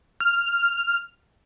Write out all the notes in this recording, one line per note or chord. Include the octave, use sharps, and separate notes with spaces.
F6